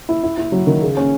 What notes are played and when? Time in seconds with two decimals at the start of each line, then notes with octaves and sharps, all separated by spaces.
0.09 E4
0.23 E4
0.38 E4
0.52 F#3
0.67 D#3
0.82 C#3
0.97 C#4